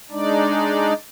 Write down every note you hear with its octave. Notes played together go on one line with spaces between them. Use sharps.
G#3 D4 D#4 D5